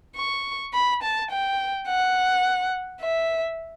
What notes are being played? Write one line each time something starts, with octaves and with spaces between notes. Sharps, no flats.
C#6
B5
A5
G5
F#5
E5